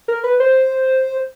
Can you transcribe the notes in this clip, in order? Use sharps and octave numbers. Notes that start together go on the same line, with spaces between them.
A#4
B4
C5